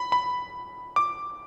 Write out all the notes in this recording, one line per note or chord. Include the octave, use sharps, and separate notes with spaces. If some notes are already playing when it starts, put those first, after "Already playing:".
Already playing: B5
B5
D6